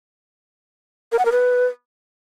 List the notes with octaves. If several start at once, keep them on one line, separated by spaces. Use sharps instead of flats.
A#4
F#5
A#4
B4